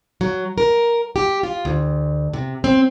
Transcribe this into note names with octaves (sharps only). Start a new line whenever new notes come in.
F#3
A#4
G4
F4
D2
C3
C4